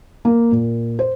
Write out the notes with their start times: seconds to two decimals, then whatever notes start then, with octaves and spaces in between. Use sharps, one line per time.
0.25 A#3
0.52 A#2
0.99 C5